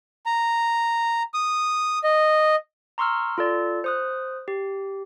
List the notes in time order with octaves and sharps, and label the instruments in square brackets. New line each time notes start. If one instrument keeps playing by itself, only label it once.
[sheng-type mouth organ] A#5
D#6
D#5
[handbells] A#5 C6 C#6 E6 F6
F4 A4 D5
C5 D#6 F#6
G4